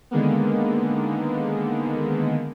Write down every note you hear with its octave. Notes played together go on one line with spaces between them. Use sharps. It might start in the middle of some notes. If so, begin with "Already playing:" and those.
D3 D#3 G#3 A#3 B3